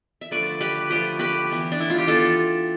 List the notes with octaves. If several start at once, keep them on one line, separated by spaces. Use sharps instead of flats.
E5
D3 F3 A3 B4 D5
G4 B4
D3 F3 A3 G4 B4
G4 B4
E3 B3
D4
E4
F4
G4
E3 B3 F4 A4